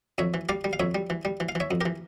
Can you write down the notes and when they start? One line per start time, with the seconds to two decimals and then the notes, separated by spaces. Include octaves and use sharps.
0.18 F2 C#5 E5
0.34 E3
0.49 G3 D5 F5
0.64 G3
0.73 F5
0.80 F2 C#5 E5
0.95 G3
1.10 E3
1.25 G3
1.40 E3
1.49 F5
1.55 E3 C#5 E5
1.71 F2
1.81 E3 G4 A#4